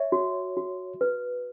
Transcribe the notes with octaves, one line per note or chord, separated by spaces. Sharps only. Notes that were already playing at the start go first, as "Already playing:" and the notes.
Already playing: C#5 E5
F#4
F#4
B4